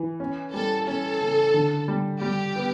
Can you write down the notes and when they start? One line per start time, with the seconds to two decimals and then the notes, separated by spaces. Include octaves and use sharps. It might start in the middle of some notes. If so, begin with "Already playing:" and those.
Already playing: E3
0.20 C#4
0.54 G3 A4
0.87 C#4 A4
1.21 C#3
1.54 D3
1.88 G3
2.21 G3 G4
2.56 B3